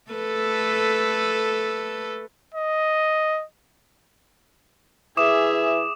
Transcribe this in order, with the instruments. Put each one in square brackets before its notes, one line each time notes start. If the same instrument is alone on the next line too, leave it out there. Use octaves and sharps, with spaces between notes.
[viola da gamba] A3 A4 B4
[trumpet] D#5
[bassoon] E3 [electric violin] G#4 E5 [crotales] D6 D#6 E7